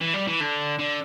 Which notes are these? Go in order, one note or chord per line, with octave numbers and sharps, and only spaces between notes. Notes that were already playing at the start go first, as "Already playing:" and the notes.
E3
G3
E3
D3
D3